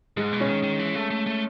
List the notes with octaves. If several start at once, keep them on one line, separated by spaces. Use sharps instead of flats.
G#2 G#3
B2
C#4
D#3
D#3
E3
A3
A3
A3